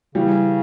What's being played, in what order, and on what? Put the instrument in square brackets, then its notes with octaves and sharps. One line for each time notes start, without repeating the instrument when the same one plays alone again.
[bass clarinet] C#3 [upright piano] E3 G3